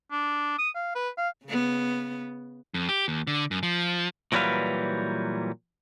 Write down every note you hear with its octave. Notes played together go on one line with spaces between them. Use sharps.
D4
D#6
F5
B4
F5
C#3 B3
F2
G4
D#2
D3
F#2
F3
A#2 E3 F#3 G3 B4 F5